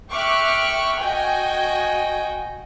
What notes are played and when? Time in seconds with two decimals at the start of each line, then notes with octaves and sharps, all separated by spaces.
0.12 E5 G5 C#6 D6 F6 F#6
1.02 F#4 D#5 G5 G#5